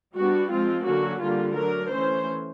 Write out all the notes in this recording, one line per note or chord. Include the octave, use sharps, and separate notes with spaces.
G3 B3 D4 F#4
F3 G#3 C4 F4
D3 F#3 A#3 C#4 F#4
D3 G3 A#3 F4
F#3 A3 D4 A#4
E3 A3 C#4 C5